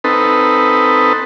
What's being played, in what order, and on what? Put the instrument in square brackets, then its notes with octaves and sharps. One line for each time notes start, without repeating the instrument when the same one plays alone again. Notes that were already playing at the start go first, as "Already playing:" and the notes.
[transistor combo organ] C4 D#4 A4 B4